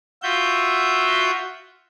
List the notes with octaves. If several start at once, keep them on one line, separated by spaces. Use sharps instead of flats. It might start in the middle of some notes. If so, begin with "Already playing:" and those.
F4 F#4 E5 G6